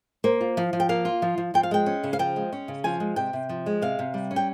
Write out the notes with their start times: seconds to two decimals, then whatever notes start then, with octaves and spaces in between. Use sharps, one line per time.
0.24 A#3 C5
0.41 F4
0.57 F3
0.73 F3
0.80 G5
0.89 A#3 F5
1.05 F4
1.22 F3
1.38 F3
1.54 F3 G5
1.63 F5
1.71 G#3 G5
1.86 C#4
2.04 C#3
2.13 F5
2.19 F3 G5
2.36 G#3
2.53 C#4
2.68 C#3
2.84 F3 G#5
3.00 G#3
3.16 C3 G5
3.33 C3
3.49 F3
3.66 G#3
3.82 C3 F5
3.99 C3
4.14 G3
4.31 C#4
4.36 G5